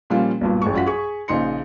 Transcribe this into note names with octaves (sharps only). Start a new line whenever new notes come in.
A#2 F3 G3 A#3 C#4 F4
B1 G2 A#2
A1 G#3 C#6
F#2 F4 F#5 B6
G#4 C#6
A#1 C#3 D#4 C6 C#7